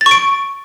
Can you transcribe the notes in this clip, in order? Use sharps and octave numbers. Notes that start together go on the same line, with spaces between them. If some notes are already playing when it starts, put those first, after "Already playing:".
A6
C#6
D7